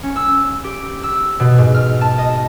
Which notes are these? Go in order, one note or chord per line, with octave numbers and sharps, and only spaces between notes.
C#4
E6
G4
E6
B2
G#2
F6
A5
D#5